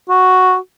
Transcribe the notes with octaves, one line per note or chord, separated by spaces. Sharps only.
F#4